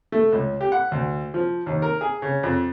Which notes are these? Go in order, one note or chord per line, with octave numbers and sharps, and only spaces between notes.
A3
C#2
G4
F#5
D2
F3
D#2
A#4
G#4
C#3
F2